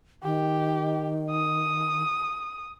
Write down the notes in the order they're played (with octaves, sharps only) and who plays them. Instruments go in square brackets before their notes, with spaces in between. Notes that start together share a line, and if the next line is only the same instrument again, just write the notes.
[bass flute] D#3 [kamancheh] G4
[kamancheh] D#6